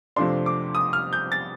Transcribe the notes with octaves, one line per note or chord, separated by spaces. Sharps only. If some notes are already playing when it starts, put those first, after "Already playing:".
F2 C3 F3 A3 D4 C6
D6
D#6
F6
G6
A6